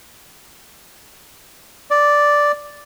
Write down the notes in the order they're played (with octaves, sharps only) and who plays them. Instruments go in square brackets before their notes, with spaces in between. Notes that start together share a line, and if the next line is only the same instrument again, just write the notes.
[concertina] D5